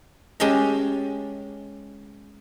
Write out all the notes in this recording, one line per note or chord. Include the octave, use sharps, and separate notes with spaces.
G#3 C#4 G4 G#4 A5 A#5